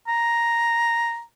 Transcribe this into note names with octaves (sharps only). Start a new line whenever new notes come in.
A#5